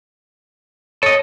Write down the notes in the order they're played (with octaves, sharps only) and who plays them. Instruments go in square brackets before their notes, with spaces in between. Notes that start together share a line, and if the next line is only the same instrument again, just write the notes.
[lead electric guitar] A4 D#5 [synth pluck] C#5